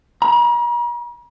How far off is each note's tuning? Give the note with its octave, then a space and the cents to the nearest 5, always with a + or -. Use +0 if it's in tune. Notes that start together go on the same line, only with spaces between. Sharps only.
A#5 +45